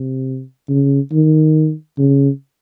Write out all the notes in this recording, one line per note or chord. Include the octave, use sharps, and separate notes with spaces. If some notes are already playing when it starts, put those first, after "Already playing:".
Already playing: C3
C#3
D#3
C#3